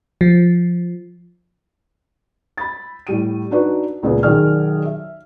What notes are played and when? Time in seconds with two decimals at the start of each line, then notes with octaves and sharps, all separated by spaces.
0.21 F3
2.58 B5 A6
3.07 A2 G3 D#7
3.51 D4 D#4 F#4 B4 D5
4.03 C#2 A#2 C#3 B3
4.23 B1 D#3 G#4 D5 F6
4.85 E5